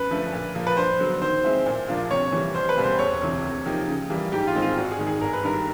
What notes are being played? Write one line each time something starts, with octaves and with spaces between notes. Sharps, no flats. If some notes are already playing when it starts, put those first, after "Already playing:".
Already playing: F#2 B4
D3 F3 A3
A#2
F3 A#3
B4
G2 C5
D3 F#3 B3
D#3 C5
G#3 C4 E4
A#2
F3 A#3 D4 F4
C3 C#5
E3 G3
C2 C5
B4
B2 G3 A#3 C#4
C5
E1 C#5
D2 C3 E3
C3
F3 A#3 D#4 G4
C#3
E3 G3 A#3
G#2 G4
F4
D#3 G#3 C4
F4
G#1 F#4
G#4
G#2 D#3 G#3
G#4
G1 A#4
B4
G2 D#3 G3 A#4